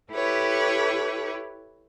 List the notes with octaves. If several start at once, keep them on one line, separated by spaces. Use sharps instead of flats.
E4 G4 A4 B4 C#5